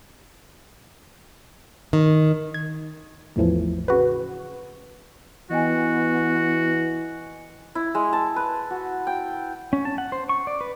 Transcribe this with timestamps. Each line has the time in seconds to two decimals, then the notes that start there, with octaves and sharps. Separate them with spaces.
1.93 D#3
2.54 G#6
3.36 A1 E2 A2 E3 F3
3.88 C#3 F#4 B4
5.51 E3 B3 F#4 D#5 G5 G#5
7.75 E4
7.95 G#3
8.13 A5
8.36 B4
8.71 F#4
9.07 G5
9.73 C#4
9.85 A5
9.98 F#5
10.12 C5
10.29 C#6
10.47 D5
10.61 B4